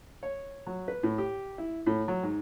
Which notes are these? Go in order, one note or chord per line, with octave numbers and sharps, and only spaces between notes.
C#5
F#3
B4
A2
G4
E4
A2
F#3
G#2